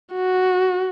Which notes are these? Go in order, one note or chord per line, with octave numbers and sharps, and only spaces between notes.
F#4